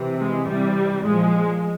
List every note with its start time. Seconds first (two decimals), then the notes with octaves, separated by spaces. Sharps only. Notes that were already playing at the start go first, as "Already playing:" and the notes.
Already playing: C3 E3
0.19 G#3
0.48 C3 E3 G3
1.05 A#2 F3 G#3